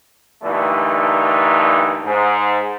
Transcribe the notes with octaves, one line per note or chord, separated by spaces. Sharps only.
G2 A#2 D3 E3 A3 D#4
G#2